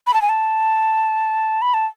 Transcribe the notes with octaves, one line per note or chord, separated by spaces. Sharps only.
B5
A5
G#5
A5
B5
A5